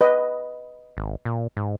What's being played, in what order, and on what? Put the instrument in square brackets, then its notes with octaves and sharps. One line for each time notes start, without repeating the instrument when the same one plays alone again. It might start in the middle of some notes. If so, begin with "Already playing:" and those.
[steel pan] B4 D#5
[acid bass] G#1
A#2
G#2